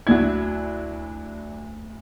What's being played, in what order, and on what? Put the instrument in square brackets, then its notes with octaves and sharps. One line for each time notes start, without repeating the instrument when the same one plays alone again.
[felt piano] D2 G#6 [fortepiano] F#3 D4 E4